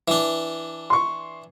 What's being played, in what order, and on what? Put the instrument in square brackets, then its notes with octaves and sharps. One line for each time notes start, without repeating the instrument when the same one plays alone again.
[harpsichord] E3 D4
[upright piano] C6 C#6